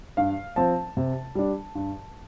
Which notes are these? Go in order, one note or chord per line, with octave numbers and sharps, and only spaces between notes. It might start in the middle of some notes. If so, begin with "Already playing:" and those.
G2 F5
F3 C4 A5
C3
G3 D4
G2